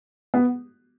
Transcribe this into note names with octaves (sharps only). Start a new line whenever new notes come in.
B3